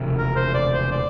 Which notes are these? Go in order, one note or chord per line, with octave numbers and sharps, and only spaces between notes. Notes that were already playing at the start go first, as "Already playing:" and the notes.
Already playing: E1 D2 C3 F3
A#4
C5
D5
C5
D5